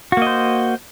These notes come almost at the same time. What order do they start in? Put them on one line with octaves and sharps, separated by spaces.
F#4 A#3 D#5 C5